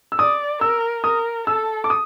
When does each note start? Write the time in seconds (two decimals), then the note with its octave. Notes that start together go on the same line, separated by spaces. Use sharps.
0.12 E6
0.19 D5 D#6
0.61 A#4 E6
1.04 A#4 D#6
1.47 A4 E6
1.84 D6
1.90 D#6